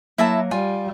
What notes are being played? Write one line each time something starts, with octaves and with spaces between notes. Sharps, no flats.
F#3 A#3 E4 E5 A5
G3 F4 G#5